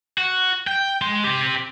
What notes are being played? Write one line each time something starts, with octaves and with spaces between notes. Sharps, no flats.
F#4
G5
G#3 C6
C4 G4